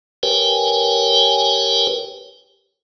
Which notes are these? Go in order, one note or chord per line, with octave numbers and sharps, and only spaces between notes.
G4 A#4 B4 C#5 G5 G#5